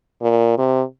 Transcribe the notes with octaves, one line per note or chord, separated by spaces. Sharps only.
A#2
C3